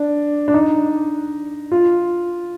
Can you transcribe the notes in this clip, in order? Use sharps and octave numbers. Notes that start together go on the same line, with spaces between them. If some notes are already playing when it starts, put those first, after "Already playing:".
Already playing: D4
D4
D#4
F4